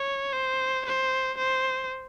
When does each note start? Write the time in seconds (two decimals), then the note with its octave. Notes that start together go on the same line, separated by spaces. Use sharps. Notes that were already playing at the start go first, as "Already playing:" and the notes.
Already playing: C#5
0.33 C5
0.86 C5
1.38 C5